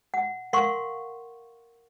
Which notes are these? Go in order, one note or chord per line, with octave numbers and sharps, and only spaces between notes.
F#5
A#4 F5 F#5 C6 C#6